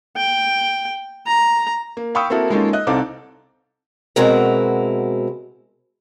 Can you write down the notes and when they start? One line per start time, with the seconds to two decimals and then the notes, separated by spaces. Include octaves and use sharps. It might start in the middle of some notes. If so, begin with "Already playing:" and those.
0.16 G5
1.27 A#5
1.97 A#3
2.15 F5 G5 B5 C#6 D#6 E6
2.30 A#3 C4 E4 F#4 A4 A#4
2.50 G#3 A#3 C#4 D#4 F4 A4
2.73 D#5 F#6
2.87 C2 C4 D#4 A4 F5 D6
4.16 B2 G#3 C4 E4 F#4 A#4